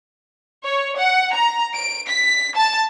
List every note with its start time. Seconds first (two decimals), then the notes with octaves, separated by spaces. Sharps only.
0.65 C#5
0.96 F#5
1.33 A#5
1.74 D7
2.08 B6
2.56 A5